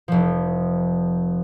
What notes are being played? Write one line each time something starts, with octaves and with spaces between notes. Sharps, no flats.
F1 F3